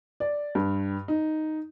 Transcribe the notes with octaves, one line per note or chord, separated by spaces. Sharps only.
D5
G2
D#4